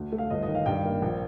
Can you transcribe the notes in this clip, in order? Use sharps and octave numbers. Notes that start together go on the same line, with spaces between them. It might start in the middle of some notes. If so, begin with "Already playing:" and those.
Already playing: D2
A3
F5
G1 D#5
D#5
D#3
F5
G2 G5
A#3
A#1